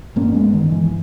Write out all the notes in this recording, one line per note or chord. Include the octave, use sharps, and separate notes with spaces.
G2 A#3 C#4
G#3 B3
D#3
E3